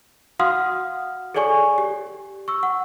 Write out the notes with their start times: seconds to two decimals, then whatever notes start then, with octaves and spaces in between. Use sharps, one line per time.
0.39 F#4 F5 F#5 C6 D#6 F6
1.34 G#4 A4 C#5 D5 G#5 C#6
1.78 G4
2.48 C#6 E6
2.63 F#5